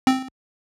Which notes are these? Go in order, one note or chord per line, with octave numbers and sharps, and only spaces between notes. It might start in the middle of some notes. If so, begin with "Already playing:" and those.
C4